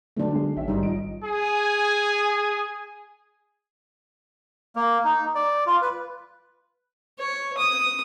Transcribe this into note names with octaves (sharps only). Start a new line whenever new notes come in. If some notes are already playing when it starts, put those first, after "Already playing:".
B1 D3 A3 D4
B1 G#3
A1 C#4 E5 G5
G#2 D#3 G3 D#4
A#1 F3 D#5 D7
G#4 G#5
A#3
D#4
D5
F4
B4
C#5
D#6